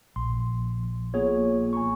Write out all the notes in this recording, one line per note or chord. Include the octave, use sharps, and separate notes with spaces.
A#1 C6
A#2 B3 G#4 C#5
G#5 A#5 C#6